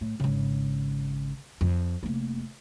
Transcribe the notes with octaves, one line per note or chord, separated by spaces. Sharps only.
A2
G#1 C#3
F2
F1 A#3